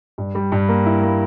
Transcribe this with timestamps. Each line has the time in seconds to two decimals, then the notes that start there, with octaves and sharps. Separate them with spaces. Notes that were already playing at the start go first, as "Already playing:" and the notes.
0.18 G2
0.35 G3
0.52 G2
0.68 A#3
0.86 E4
1.02 A#3